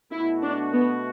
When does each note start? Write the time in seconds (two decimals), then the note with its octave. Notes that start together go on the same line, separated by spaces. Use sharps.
0.11 B2 A3 E4 F#4
0.42 D4
0.73 B3